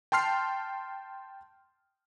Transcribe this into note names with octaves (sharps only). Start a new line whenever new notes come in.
G5 A5 C6 F6 C7